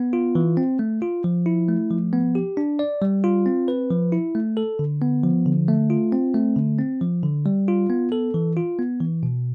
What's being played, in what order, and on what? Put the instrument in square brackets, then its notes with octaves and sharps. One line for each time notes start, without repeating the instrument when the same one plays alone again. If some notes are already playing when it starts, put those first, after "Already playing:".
Already playing: [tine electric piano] B3
F4
E3
C4
A3
F4
F3
E4
A3
F3
B3
G4
D4
D5
G3
F4
C4
B4
F3
E4
A3
A4
D3
B3
F3
D3
A3
F4
C4
A3
D3
C4
F3
D3
G3
F4
B3
A4
E3
F4
B3
E3
B2